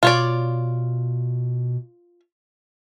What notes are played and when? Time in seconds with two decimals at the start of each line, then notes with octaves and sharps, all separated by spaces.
0.03 B2 F4 C#5 D5